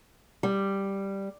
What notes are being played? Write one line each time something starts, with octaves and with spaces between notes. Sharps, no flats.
G3